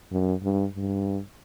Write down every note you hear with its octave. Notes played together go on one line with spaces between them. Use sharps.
F#2
G2
G2